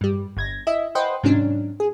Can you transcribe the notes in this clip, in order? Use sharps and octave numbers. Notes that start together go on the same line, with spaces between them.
G2 G3
G1 G#6 A#6
E4 D#5 E5
B4 C5 D#5 F#5 G5 C6
G#2 C3 D#3 F#3 C#4 D4
G#4